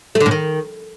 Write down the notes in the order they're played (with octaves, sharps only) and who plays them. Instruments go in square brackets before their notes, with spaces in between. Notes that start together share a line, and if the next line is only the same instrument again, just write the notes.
[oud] A3
D3
A2
D#3